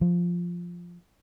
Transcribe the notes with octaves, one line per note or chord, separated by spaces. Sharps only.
F3